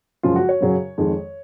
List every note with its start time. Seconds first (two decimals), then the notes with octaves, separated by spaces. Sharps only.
0.23 F#2 C#3 F3 G#3 F4
0.36 F#4
0.49 C#5
0.60 F#2 C#3 F#3
0.98 F2 D#3 G#3